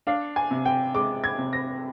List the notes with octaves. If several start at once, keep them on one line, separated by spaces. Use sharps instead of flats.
D4 F5
G#5
C3
G5
G#3 D6
G#6
C3
A#6